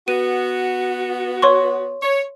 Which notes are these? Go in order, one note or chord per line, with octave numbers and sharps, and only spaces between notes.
B3 F#4 D#7
C#5 C6 C#6
C#5